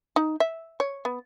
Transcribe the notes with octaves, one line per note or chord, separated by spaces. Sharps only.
D#4
E5
C#5
B3